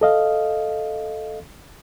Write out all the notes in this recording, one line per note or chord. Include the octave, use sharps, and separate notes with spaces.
A4 D#5 F5